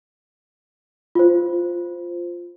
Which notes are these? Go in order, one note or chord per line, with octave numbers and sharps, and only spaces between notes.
F4 C5